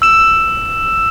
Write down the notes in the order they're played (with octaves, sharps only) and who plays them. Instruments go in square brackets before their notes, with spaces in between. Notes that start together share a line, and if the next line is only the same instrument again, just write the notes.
[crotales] E6 E7